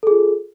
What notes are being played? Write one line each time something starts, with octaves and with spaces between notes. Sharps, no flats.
F4 G#4 A4